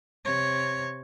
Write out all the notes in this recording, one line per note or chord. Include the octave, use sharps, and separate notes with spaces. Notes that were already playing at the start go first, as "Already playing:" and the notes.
C3 C#5